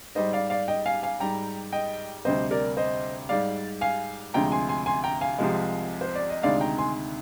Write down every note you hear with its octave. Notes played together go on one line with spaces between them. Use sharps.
G#2 G3 C5 D#5
D5 F5
D5 F5
D#5 G5
F5 G#5
F5 G#5
G#2 G3 G5 A#5
D#5 G5
D2 C3 G3 C5 D#5
A#4 D5
C5 D#5
G#2 G3 D5 F5
F5 G#5
D2 C3 F3 G#3 G5 A#5
G#5 C6
G#5 C6
G#5 C6
G5 A#5
F5 G#5
C2 C3 F3 G#3
C5
D5
D#5
D2 C3 D#3 G#3 D5 F5
G5 A#5
G#5 C6